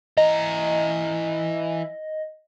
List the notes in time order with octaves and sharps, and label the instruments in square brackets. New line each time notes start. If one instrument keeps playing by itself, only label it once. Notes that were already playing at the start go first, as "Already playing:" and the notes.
[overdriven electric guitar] E3 A#5 [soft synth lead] D#5